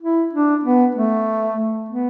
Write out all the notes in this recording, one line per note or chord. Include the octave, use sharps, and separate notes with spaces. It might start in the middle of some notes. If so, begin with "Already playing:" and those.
E4
D4
B3
A3
B3